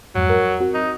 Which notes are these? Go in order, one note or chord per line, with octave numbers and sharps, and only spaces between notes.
F2 G#2 F#3
A#4
C4 F#4
D#4